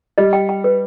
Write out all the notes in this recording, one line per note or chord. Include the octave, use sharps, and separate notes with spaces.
G3 D#5
G5
G5
B4